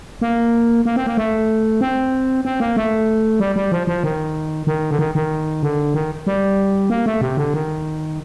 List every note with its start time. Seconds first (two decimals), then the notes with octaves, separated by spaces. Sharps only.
0.21 A#3
0.85 A#3
0.96 C4
1.07 A#3
1.17 A3
1.81 C4
2.45 C4
2.60 A#3
2.77 A3
3.40 G3
3.56 G3
3.72 F3
3.87 F3
4.03 D#3
4.67 D#3
4.91 D3
4.99 D#3
5.15 D#3
5.63 D3
5.94 D#3
6.27 G3
6.90 A#3
7.06 A3
7.21 C3
7.37 D3
7.54 D#3